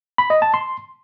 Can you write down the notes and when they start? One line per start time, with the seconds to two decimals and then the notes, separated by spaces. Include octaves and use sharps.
0.18 B5
0.30 D#5
0.42 A5
0.54 C6